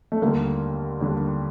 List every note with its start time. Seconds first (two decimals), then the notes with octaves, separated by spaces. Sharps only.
0.12 A3
0.22 D#2 D3 G3 A#3
1.00 D#2 D3 G3 D4